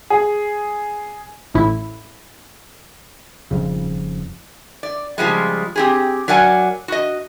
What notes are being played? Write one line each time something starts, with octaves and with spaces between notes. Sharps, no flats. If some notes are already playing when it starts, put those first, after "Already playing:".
G#4
A1 A2 E4
D#1 F2 C#3
D5
C#3 F3 G3 G#3
C4 G4 G#4
F#3 A#4 D5 F#5 G#5
F#4 D#5